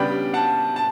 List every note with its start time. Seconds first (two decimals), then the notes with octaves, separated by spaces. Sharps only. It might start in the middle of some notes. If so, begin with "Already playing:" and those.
Already playing: C#3 G3 B3 D4 G5 B5
0.34 F#5 A5
0.76 A5